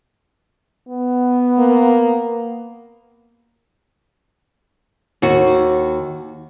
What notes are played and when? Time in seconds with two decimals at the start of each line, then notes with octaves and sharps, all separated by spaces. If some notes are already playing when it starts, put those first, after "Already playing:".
0.89 B3
1.58 A#3
5.22 D#2 F#4